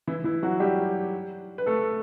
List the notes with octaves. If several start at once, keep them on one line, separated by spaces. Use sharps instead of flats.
E3 E4
E3 E4
F#3 F#4
G3 G4
B4
A3 A4